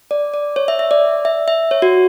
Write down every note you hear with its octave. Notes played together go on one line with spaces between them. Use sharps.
D5
D5
C#5
E5
E5
D5
E5
E5
C#5
F#4